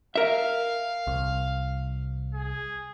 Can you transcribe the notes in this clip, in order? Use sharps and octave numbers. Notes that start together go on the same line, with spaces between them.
A#4 E5 F5
C2
G#4